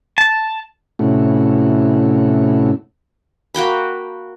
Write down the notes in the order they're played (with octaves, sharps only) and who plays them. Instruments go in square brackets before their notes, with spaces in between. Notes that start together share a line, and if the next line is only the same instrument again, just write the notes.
[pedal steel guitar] A5
[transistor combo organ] A2 C3 A3 C#4 E4 F#4
[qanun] A#3 F#4 G5 B5